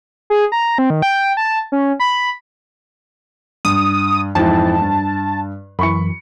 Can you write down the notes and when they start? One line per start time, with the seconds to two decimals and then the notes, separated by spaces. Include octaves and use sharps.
0.30 G#4
0.52 A#5
0.78 C4
0.90 D#3
1.02 G5
1.37 A5
1.72 C#4
2.00 B5
3.65 G2 D#6
4.35 F2 G#2 E3 A5
4.82 G2
5.79 F#2 E3 B5 C#6 C#7